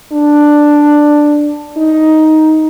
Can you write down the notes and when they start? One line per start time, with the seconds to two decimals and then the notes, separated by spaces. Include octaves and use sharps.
0.12 D4
1.77 D#4